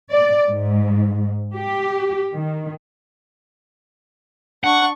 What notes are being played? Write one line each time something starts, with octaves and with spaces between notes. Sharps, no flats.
D5
G#2
G4
D#3
D4 F#5 C#6